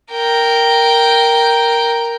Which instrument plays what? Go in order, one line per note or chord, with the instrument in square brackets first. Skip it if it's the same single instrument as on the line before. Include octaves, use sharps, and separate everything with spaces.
[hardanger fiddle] A#4 G5